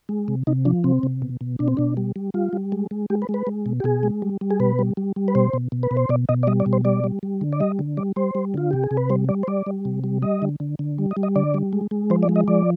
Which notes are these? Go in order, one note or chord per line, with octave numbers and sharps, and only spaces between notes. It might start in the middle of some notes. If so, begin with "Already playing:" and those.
G#3
C3
C3 D#4
F3 D4
C3 C4
C3
B2
B2
B2 D4
C4
B2 D4
G3
G3
G3 F4
G3
G#3
G#3
G#3 G4
B4
G#3
B4
G#3
B2
G4
B2 G#4
G#3
G3
G3
G#4
B2 B4
G3
G3
G3
B4
B2 C5
B2
B2
B4
B2
C5
B2 D5
B2 D#5
D5
G3 D#5
D5
B2
C5
G3 D5
G3
G3
D3
D5
G3 D#5
D3
G3 D5
G3 C5
G3
D3 F4
C3 G4
G#4
C3
B4
G3 C5
G3 D5
C5
G3 D5
G3
C3
G3
G3 D#5
D3
D3
D3
G3
D#5
G3
D#5
D3 D5
G3
G#3
G#3
F3 C5
D5
G#3
D#5
F3 D5